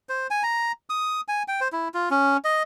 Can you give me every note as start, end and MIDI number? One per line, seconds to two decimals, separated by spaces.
0.09 0.27 72
0.30 0.43 80
0.43 0.72 82
0.90 1.21 87
1.28 1.43 80
1.48 1.60 79
1.61 1.68 72
1.73 1.88 64
1.94 2.09 65
2.11 2.37 61
2.45 2.63 75